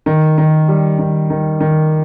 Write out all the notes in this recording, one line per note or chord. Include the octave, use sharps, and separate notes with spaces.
D#3
D#3
G3
D#3
D#3
D#3